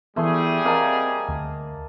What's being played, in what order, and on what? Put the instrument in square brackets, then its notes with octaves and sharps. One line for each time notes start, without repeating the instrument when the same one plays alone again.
[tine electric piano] E3 B3 [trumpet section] G3 G#4 [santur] A3 C6
[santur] A#3 D#5 A5 [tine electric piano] C4
[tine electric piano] D2